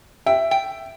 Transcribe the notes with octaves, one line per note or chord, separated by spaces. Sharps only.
E5 G5
G5